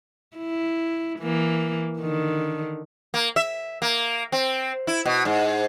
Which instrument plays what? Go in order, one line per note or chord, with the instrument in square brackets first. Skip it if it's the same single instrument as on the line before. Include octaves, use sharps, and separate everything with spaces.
[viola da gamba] E4
E3 A#3
D3 D#3
[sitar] A#3
E5
A#3
C4
E4
B2
G#2